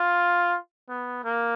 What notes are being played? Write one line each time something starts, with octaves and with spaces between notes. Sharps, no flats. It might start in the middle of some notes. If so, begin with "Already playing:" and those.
Already playing: F4
B3
A#3